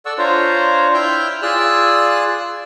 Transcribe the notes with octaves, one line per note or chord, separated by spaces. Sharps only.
A4 D5 F#5 C#6 E6
D4 F4 C5 C#5 A#5
E4 E5 G5 F6 G6
F4 G#4 D5 E6 F#6